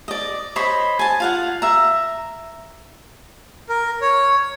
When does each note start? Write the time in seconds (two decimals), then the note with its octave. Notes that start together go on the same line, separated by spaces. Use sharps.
0.08 D5 D#5
0.56 C5 C#5 D#5 B5
0.99 G#5 A5
1.20 F4 F5 F#5
1.62 E5 A#5
3.69 A#4
4.01 C#5